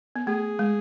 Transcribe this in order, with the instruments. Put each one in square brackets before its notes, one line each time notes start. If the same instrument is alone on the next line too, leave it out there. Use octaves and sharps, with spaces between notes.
[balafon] B3
[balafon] A3 [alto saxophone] G#4
[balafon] G#3